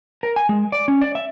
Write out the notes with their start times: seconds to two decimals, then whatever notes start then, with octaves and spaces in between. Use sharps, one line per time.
0.23 A#4
0.36 G#5
0.49 G#3
0.72 D5
0.88 C#4
1.01 D5
1.15 E5